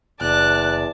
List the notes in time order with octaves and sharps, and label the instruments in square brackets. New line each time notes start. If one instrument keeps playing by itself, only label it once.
[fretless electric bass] F#1 [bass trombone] E2 [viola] D5 A5 [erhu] F#6